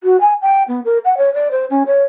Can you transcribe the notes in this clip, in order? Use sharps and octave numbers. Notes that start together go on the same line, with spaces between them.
F#4
G#5
G5
B3
A#4
F#5
C#5
D5
C5
C#4
C#5